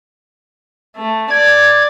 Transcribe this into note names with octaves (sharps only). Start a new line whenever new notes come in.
A3
D5 G#6